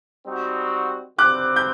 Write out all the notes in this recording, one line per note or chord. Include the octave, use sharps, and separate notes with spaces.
G3 C4 D#4 F#4
D3 G3 C4 D6 F#6
G6